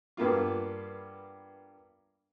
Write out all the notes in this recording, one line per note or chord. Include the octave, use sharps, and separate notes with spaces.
G2 A#3 B3 F4